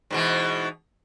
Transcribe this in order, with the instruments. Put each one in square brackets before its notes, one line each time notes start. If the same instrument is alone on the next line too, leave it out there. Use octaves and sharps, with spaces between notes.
[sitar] G#2 B2 E3